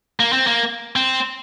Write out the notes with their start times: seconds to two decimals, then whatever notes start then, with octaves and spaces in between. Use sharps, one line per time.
0.20 A#3
0.33 C4
0.47 A#3
0.96 C4